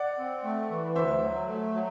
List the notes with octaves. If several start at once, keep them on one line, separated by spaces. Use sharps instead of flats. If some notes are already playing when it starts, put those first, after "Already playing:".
Already playing: D5 F#5
C4
A3
E3
D2 C5 E5
F#3
A3
F#3